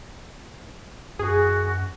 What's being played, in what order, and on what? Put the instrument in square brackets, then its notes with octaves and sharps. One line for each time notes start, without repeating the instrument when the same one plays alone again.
[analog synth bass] F#2 [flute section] F#4 [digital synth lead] G#4